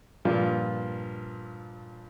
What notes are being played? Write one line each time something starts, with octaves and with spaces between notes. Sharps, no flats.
G2 A#2 F3